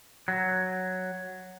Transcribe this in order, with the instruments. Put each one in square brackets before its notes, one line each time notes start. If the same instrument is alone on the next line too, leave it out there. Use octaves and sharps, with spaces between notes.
[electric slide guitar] F#3